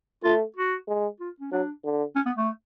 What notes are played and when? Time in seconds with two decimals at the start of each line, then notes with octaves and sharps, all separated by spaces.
0.24 A3 F4
0.56 F#4
0.88 G#3
1.20 F4
1.40 C#4
1.52 F#3 D4
1.84 D3
2.16 C#4
2.26 B3
2.37 A3